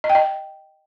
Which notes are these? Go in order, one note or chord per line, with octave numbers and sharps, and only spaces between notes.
D#5
G5
D#5